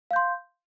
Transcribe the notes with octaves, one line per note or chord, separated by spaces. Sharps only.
F5 C6 G6